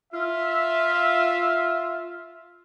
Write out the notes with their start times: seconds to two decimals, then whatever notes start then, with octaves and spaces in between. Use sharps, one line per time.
0.13 F4 E5